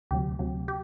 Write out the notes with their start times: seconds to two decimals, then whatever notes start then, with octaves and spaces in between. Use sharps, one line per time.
0.11 D2 C3 F#3 G4
0.39 D2 C3 F#3
0.68 G4